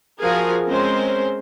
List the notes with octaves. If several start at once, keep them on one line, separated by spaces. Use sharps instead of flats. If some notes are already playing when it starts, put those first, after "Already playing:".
F3 F#4 G#4 A#4 F5 G#5
G#3 C4 C#4 A#4 C5